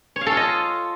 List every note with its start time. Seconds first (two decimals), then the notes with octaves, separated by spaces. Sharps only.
0.16 C#5
0.21 F5
0.26 A4
0.32 F4
0.37 D#5